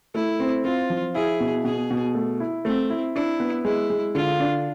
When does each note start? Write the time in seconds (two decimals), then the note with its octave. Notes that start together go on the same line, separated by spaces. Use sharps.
0.15 A3 E4
0.40 C4
0.64 C4 F4
0.90 F3
1.15 E4 G#4
1.40 B2
1.65 B2 G#4
1.90 B2
2.15 A3
2.40 E4
2.65 A3 C4
2.90 E4
3.16 D4 E4
3.40 B3
3.65 G#3 E4
3.90 G#3
4.15 D3 F4
4.40 D4